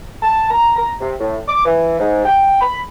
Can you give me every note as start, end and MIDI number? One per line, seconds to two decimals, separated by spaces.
0.23 0.48 81
0.51 0.70 82
0.76 0.91 82
1.00 1.14 48
1.20 1.39 45
1.47 1.62 86
1.65 1.98 52
2.00 2.23 44
2.25 2.58 79
2.61 2.79 83